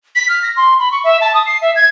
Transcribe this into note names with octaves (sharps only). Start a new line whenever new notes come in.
B6
F6
A#6
C6
B5
C#6
E5
A5
D#6
C7
E5
G#6